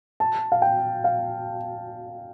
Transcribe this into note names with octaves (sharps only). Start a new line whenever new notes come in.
A5
F5
G5
F5